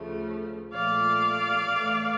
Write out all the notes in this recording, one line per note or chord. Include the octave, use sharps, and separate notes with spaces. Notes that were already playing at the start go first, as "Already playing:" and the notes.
Already playing: D2 C#3 F3 A3
A#2 F3 A3 D5 F5
A2 E3 A3